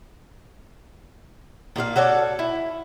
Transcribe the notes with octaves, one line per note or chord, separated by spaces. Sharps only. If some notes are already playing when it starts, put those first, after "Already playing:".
A#2 A#3 F#4 F5
F#4 A4 C#5 D5
E4